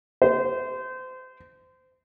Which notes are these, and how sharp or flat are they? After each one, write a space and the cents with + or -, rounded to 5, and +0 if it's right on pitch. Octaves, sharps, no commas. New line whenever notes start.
C5 -30